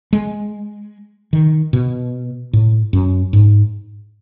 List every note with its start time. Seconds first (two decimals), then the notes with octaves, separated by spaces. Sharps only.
0.13 G#3
1.33 D#3
1.73 B2
2.53 A2
2.93 F#2
3.33 G#2